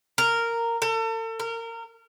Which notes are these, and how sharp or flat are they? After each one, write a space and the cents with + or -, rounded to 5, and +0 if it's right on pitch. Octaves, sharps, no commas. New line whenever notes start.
A#4 -10
A4 +40
A#4 -25